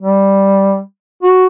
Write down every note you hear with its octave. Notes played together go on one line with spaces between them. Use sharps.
G3
F#4